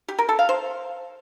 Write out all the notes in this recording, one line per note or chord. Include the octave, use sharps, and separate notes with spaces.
G4
A#4
A4
F5
C5